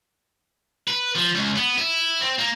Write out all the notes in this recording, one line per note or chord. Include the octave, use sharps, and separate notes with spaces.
B4
F3
C#2
B3
E4
C4
A#3